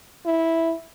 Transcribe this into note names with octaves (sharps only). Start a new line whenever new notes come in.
E4